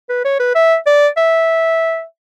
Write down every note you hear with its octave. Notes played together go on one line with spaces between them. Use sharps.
B4
C#5
B4
E5
D5
E5